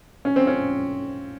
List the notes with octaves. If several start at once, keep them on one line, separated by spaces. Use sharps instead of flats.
C#4
C4
C#4